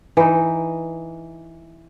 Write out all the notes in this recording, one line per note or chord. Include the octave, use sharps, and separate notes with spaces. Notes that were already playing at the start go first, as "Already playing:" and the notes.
E3 D#4